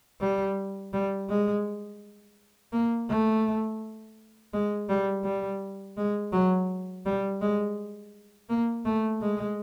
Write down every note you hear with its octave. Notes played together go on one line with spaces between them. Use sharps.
G3
G3
G#3
A#3
A3
G#3
G3
G3
G#3
F#3
G3
G#3
A#3
A3
G#3